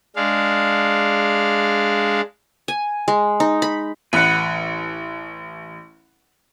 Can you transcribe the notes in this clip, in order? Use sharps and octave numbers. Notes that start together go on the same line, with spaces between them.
G#3 D4 F5
G#5
G#3
D#4
B5
A1 B4 F#5